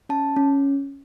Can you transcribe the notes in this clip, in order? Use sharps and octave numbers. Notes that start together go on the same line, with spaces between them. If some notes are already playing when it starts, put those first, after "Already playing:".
C#4 A5
C#4